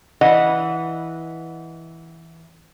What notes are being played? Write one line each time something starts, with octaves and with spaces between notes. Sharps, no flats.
E3 D#5 F#5